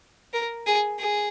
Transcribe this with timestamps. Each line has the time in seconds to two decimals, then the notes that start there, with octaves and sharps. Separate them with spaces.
0.34 A#4
0.67 G#4
0.99 G#4